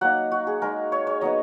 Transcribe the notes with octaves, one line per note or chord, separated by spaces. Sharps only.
F#3 A#3 D#4 F#5
F#4
G#4
G#3 D#4 A#4
C#5
C#5
F#3 B3 D#4 D#5